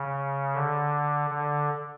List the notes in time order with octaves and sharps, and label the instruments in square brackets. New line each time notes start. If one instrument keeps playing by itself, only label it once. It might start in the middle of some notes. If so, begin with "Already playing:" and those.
Already playing: [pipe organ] C#3
D3
D3